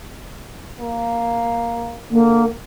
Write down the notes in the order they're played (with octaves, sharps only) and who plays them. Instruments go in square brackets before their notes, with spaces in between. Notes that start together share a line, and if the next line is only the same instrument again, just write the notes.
[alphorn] A#3
[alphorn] D3 [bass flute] A#3